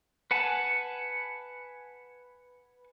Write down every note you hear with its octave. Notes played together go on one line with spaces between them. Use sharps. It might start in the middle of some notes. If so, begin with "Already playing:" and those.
B4 F#5 G#5 A5